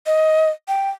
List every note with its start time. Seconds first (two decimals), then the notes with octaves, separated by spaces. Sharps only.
0.06 D#5
0.68 G5